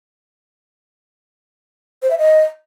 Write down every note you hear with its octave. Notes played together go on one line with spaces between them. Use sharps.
C5
E5
D#5